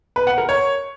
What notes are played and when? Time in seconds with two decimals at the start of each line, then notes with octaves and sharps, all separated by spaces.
0.16 B4
0.27 F#5
0.38 A#4
0.49 C#5